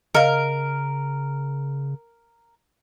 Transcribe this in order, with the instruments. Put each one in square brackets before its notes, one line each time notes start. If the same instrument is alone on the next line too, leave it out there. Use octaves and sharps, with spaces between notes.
[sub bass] C#3 [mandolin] A#4 [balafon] D#5 F5